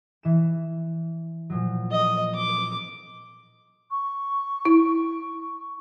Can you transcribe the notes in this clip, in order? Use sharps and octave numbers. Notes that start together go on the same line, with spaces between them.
E3 E7
A#2 F3 F#3
D#5
D6
C#6
E4